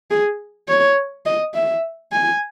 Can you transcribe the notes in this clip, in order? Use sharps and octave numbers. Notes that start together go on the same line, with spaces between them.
G#4
C#5
D#5
E5
G#5